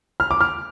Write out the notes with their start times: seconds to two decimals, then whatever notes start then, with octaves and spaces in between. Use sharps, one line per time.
0.20 F6
0.31 D6
0.41 F6